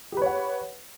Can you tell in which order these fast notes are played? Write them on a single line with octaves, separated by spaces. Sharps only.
G4 B4 C#5 F#5